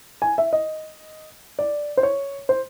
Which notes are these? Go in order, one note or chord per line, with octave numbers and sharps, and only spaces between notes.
G#5
E5
D#5
D5
C5
C#5
C5